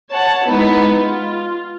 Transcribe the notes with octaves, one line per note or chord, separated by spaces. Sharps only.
C#5 F#5 A5
G#3 B3 D#4 E4
F4